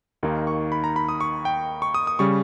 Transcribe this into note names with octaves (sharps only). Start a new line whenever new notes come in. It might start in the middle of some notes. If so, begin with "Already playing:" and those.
D#2 D#3 A#3 D#4
C#6
B5
A#5
B5
D#6
C#6
G5
C#6
D#6
D#6
C#3 G3 C#6